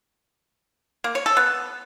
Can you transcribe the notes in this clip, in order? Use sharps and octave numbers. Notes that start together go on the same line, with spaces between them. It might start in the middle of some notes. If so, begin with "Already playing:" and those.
A#3
C#5
A4
B3